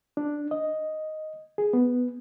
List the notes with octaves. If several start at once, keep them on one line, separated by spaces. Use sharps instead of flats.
D4
D#5
G#4
B3